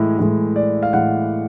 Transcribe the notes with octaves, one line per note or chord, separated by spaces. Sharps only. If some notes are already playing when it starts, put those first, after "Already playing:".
Already playing: A2 E3 G#3
A2 E3 G#3
D5
F5
A2 E3 G#3 F#5